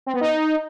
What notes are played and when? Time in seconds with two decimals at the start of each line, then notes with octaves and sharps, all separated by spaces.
0.07 C4
0.14 B3
0.21 D#4